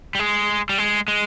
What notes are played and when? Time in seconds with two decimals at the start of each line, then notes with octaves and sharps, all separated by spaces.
0.15 G3
0.19 G#3
0.69 G3
0.78 G#3
1.08 G#3